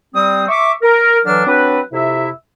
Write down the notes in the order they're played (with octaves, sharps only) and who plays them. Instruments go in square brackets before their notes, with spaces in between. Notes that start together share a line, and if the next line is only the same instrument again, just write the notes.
[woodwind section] G3 C4 D#6
E5 C#6 D6
A#4
D3 E3 F#3 D4 D6 F6
F#3 C4 D4 B4
F2 C3 E4 E5